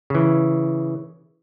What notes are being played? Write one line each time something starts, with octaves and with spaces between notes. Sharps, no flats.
C#3 E3